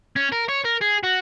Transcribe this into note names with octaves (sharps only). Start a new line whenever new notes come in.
C#4
A#4
C#5
A#4
G#4
F#4